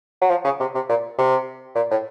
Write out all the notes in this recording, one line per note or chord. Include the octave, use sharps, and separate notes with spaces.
F#3
F3
C#3
C3
C3
A#2
C3
A#2
A2